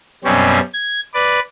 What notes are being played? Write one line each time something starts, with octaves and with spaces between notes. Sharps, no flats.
F#2 B2 G3 C4 C#4
G#6
B4 D5